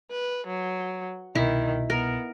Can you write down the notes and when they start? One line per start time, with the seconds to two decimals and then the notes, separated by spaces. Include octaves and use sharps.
0.11 B4
0.47 F#3
1.35 C2 B2 D#3 E4
1.90 B3 A#4